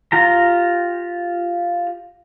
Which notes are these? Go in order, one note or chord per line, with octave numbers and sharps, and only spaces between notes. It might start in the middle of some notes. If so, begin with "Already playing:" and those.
F4 G4 A#5